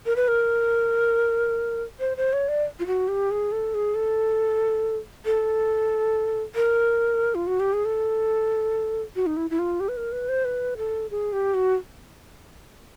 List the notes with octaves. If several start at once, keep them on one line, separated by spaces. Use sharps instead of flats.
A#4
B4
A#4
C5
C5
C#5
D5
F4
F#4
G4
G#4
A4
G#4
A4
A4
A#4
F4
F#4
G4
G#4
A4
F#4
D#4
E4
E4
F4
G4
B4
A#4
B4
C5
B4
A4
G#4
G4
F#4